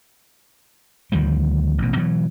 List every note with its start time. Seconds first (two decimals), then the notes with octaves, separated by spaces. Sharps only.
1.12 D2 D#3 F3 G3
1.78 A1 B2
1.97 B2 E3 F#3